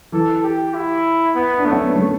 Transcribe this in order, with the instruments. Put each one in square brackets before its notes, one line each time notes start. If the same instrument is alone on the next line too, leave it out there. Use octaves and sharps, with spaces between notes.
[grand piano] E3 [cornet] A4
[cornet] G4
E4
B3
[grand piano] D4
[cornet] A3 [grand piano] C#4
[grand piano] B3
A3